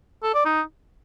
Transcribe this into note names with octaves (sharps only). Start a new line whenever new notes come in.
A4
D5
D#4